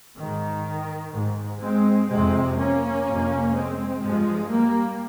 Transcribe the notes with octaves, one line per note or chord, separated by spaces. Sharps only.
G#2 D#3
G#2
G#3 C4
F2 C3 G#3 C4
A#3 C#4
F2 C3
G#3 C4
G2 F3 G#3
G3 A#3